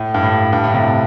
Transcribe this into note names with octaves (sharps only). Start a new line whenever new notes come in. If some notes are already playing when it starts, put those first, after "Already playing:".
Already playing: A2
G2
A2
G2
A2
C3